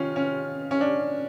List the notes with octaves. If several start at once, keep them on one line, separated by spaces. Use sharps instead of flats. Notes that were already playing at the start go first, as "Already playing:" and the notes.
Already playing: D#3 C#4 F4
C#4
C#4
D4